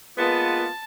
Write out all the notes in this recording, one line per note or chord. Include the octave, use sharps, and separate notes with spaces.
G#3 A#3 B3 F4 A5